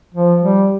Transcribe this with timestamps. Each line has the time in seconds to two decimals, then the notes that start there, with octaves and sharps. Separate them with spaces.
0.14 F3
0.43 G3